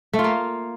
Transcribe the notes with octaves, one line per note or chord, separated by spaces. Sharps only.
A3
F4
A#3